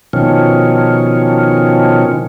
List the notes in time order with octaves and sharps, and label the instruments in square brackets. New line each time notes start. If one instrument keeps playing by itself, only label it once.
[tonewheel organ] B2 D#3 F3 C#4